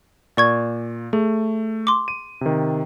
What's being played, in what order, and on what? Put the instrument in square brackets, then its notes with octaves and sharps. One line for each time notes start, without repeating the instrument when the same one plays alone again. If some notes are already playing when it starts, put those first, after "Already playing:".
[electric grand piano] A#2 [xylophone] D5 C#6 G#6
[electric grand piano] A3 [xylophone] G#4
[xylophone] C6 D6
[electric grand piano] D#7
C3 D#3